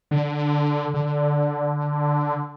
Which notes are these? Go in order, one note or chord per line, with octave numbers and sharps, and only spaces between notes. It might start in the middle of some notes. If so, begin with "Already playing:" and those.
D3
D3